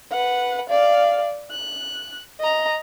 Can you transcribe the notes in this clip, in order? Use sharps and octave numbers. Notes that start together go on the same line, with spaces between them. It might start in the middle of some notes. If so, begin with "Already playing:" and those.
B4 F#5
D5 F5
F#6
D#5 A#5